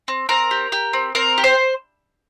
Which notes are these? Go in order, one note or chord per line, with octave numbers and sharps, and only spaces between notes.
C4
C4 A#4
G4
G4
C4
C4 A#4
G4
C5